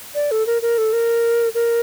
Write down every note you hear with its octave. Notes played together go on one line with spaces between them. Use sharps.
D5
A4
A#4
A#4
A4
A#4
A#4